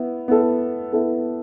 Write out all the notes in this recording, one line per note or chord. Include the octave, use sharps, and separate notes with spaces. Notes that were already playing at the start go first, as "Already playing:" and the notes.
Already playing: B3 E4
B3 E4 A4
B3 E4 A4